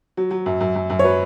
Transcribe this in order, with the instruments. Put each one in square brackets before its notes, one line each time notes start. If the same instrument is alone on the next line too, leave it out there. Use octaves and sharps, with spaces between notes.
[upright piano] F#3
F#3
F#2
F#2
F#2
F#2
C#5
F#3 B4